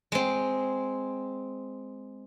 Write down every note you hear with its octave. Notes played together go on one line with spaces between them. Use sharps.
G#3 C4